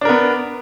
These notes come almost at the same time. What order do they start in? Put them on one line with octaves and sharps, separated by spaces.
D4 A#4 B3